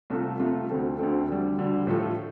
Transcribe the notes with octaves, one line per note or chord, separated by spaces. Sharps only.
C2 C3 A3 F4 A4
C2 C3 A3 F4 A4
D2 D3 A3 C4 A4
D2 D3 A3 C4 A4
D2 D3 G3
D2 D3 G3
A2 F3 A3 F4 A4